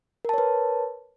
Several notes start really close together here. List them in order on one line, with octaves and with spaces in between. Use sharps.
A#4 A5 C#5 B4